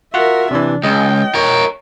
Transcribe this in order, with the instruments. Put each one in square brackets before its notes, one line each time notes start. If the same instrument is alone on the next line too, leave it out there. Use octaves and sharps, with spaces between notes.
[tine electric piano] F4 F#4 F#5 [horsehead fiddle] A#4 E5
[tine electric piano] C3 E3 [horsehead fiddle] D4
[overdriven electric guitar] C#2 [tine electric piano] D#5 [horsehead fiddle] G5
[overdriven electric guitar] A#4 C#5